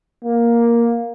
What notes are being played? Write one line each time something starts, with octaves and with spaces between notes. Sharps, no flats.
A#3